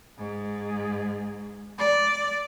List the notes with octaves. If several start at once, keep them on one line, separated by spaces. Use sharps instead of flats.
G#2
D5